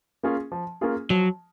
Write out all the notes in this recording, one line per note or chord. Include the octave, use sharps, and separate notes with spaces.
A#3 C#4 F4 G#4
F3
A#3 C#4 F4 G#4
F3 F#3